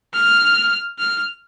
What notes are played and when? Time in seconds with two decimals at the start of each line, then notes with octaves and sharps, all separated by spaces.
0.13 F6
0.99 F6